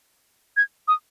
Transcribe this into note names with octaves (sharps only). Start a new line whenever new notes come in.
G#6
D#6